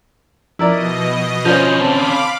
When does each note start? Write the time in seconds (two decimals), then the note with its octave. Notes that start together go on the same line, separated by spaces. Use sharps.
0.59 B2 F3 E4 A#4 D5 D#5
1.45 D3 F3 C#4 F4 C5 G6
1.81 C4 F5 A5 B5 D6